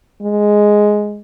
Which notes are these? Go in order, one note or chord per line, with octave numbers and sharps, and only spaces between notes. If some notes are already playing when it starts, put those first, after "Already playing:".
G#3